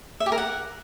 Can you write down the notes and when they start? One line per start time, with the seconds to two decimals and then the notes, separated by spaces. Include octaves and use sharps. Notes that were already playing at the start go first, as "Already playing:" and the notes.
0.20 E5
0.26 G4
0.32 A#4
0.38 F#5